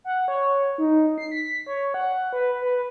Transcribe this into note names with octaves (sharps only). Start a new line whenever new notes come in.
F#5
C#5
D#4
C7
B6
C#5
F#5
B4
B4